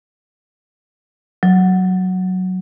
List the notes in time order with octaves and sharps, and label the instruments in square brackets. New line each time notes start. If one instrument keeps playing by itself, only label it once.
[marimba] F#3